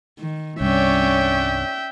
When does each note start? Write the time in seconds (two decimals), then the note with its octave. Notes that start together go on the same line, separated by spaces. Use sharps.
0.19 D#3
0.61 C2 G2 C#4 C#5 D5 E5 G5